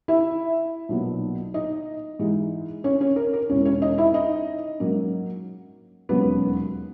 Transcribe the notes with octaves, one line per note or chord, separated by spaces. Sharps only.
E4 E5
B1 A#2 F#3 B3
D#4 D#5
G#2 E3 G#3 D#4
C#4 C#5
C#4 C#5
A#4
A#4
E1 E2 C#3 C#4 C#5
C#4 C#5
D#4 D#5
E4 E5
D#4 D#5
G#2 F#3 A#3 C#4
E1 D#2 C#3 F#3 B3 B4